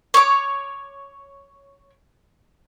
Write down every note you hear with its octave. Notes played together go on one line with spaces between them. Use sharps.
C#5 D6